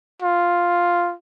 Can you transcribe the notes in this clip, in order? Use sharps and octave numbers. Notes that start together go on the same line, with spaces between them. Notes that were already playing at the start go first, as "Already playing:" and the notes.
F4